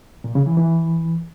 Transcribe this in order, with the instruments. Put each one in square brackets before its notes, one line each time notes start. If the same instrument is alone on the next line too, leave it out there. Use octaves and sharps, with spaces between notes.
[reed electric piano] A#2
C#3
E3
E3